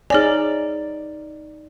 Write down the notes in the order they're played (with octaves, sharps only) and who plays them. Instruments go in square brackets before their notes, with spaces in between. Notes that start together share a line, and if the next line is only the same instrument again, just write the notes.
[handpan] D#4 D5 [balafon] G#4 C#5 G#5